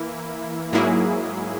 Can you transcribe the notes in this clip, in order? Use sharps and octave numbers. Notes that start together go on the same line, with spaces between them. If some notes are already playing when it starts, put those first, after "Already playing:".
Already playing: E3 A#3 E4
G#2 F#3 A#3 E4 G#4